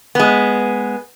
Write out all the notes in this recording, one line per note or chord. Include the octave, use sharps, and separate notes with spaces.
G#3 B3